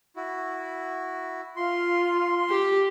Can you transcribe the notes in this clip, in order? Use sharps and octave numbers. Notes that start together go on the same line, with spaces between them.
E4 F#4
F4 C6
G4